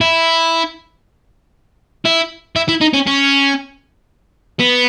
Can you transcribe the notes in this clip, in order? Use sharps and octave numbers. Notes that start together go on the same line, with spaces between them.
E4
E4
E4
E4
D#4
C#4
C#4
B3